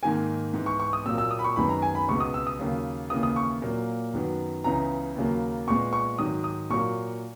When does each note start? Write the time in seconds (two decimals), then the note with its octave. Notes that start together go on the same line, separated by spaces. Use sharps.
0.03 G#2 D#3 A#3 G#5
0.53 G#2 E3 B3
0.66 C#6
0.80 C#6
0.93 D#6
1.06 A#2 F#3 A#3 E6
1.18 E6
1.31 D#6
1.39 B5
1.44 C#6
1.56 F#2 D#3 G#3 B3 B5
1.69 A#5
1.82 G#5
1.95 B5
2.08 C#2 B2 G#3 B3 C#6
2.20 D#6
2.34 E6
2.47 D#6
2.59 D#2 C#3 F#3 A#3
3.10 D#2 C#3 E3 A#3 D#6
3.23 D#6
3.36 C#6
3.62 A#2 F#3 A#3
4.13 F#2 D#3 F#3 B3
4.64 C#2 C#3 E3 B3 A#5
5.16 D#2 C#3 F#3 A#3
5.68 A#2 G#3 B3 C#6
5.93 C#6
6.18 G#2 D#3 F#3 D#6
6.44 D#6
6.70 A#2 F#3 A#3 C#6